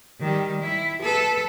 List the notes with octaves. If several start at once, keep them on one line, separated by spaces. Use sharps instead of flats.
D#3 G3
E4
A4 B4